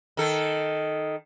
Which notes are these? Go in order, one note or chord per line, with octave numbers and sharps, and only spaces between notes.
D#3 A4